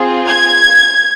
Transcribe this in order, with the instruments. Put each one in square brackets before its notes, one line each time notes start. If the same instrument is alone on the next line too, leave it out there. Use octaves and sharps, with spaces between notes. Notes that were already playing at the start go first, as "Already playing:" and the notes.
Already playing: [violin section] C4 F4 G#4
G#6